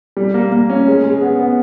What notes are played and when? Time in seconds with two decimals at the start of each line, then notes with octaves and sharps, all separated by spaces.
0.17 G3
0.34 A#3
0.52 A#3
0.70 C#4
0.87 G#3
1.04 G#3
1.22 B3
1.39 B3